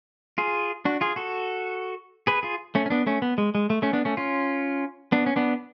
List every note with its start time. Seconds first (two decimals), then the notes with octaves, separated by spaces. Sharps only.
0.38 F4 G#4
0.85 D4 F#4
1.01 F4 G#4
1.16 F#4 A4
2.27 G#4 B4
2.43 F4 G#4
2.75 A3 C#4
2.86 C#4
2.90 B3 D4
3.07 A3 C#4
3.22 B3
3.38 G#3
3.55 G#3
3.70 A3
3.82 A3 C#4
3.93 B3 D4
4.05 A3 C#4
4.17 C#4 F4
5.12 B3 D4
5.26 C#4
5.36 B3 D4